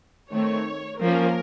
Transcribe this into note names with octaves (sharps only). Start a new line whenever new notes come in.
D#3 A3 C4 C#5
F3 A#3 C#4 A#4